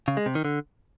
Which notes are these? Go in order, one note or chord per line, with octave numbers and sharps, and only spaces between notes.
C#3
G#3
C3
D#3
D3